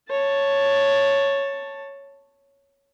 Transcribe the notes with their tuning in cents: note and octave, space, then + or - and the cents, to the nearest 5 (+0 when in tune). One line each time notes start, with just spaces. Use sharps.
C#5 +0 A5 +5